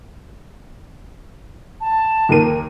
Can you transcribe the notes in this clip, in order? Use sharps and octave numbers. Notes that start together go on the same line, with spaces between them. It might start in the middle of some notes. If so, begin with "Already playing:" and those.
A5
D#2 A#4 D#7